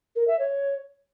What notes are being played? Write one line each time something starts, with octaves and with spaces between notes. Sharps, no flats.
A#4
E5
C#5